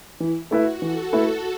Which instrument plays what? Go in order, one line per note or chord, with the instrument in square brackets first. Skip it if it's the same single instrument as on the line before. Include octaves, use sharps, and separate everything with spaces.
[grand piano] E3 [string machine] E4
[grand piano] A3 E4 B4 E5 [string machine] F#4
[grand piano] E3 [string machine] A4
[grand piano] A3 E4 B4 E5